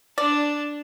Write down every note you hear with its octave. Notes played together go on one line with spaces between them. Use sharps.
D4 D5 A5